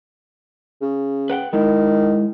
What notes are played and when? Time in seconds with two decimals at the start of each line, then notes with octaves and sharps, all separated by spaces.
0.82 C#3
1.30 B4 F#5 G5
1.53 D#3 G#3 E4